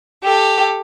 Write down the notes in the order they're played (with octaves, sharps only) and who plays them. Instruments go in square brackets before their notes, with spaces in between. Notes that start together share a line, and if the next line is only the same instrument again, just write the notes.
[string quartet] G4 A4